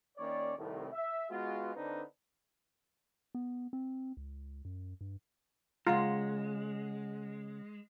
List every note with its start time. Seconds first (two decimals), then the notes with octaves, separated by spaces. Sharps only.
0.18 D#3 A#3 C#4 C#5 D5
0.57 C2 A2 D#3
0.93 E5
1.30 G#3 B3 F4 F#4
1.75 D3 C4 D4 D#4 B4
3.35 B3
3.73 C4
4.17 C#2
4.65 F#2
5.01 G2
5.87 C#3 G#3 F4 F#5 A#5